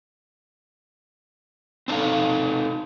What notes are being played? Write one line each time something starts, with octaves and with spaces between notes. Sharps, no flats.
C4 D4 D#4 A4 F5